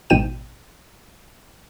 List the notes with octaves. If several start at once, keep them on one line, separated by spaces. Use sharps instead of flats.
A1 G#2 B2 G5 D#7 E7